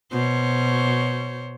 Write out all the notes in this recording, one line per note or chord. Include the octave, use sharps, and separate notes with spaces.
B2 C5 C#5